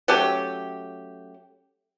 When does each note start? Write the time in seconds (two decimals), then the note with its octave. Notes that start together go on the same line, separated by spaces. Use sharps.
0.08 F#3 A3 C#4 G4